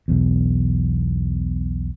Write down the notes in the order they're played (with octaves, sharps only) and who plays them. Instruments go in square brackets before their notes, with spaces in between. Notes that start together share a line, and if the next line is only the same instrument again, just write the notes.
[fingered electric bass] B1 E2